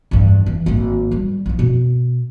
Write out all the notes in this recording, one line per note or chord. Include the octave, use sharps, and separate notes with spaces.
E2 G2
E3
G#1 A#3
G3
F3 E4
B2